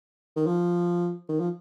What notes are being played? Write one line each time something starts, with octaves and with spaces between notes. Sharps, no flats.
D#3
F3
D#3
F3